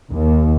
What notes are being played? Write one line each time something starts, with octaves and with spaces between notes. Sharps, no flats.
D#2